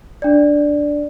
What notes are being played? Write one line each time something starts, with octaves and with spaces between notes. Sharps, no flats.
D4 D5